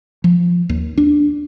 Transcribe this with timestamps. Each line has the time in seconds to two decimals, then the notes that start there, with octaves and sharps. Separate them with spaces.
0.24 F3
0.69 D#2
0.98 D4